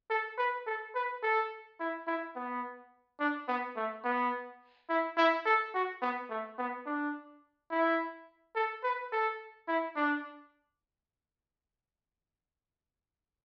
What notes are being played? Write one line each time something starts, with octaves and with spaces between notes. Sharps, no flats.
A4
B4
A4
B4
A4
E4
E4
B3
D4
B3
A3
B3
E4
E4
A4
F#4
B3
A3
B3
D4
E4
A4
B4
A4
E4
D4